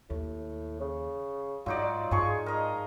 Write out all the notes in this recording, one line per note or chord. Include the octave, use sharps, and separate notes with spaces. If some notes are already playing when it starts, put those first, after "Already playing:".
D#2 A2
C#3
G#2 F#3 D#4 F4 D5
G#2 F3 G#4 C#6
A#4 D#5